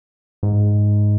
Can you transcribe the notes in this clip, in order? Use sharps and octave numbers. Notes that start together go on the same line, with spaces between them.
G#2